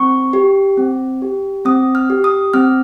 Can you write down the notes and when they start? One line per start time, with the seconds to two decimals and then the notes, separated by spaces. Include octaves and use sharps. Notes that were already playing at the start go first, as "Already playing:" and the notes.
Already playing: C4 C#6
0.33 G4
0.77 C4
1.22 G4
1.65 C4 D#6
1.95 F6
2.10 G4
2.24 D#6
2.54 C4 F6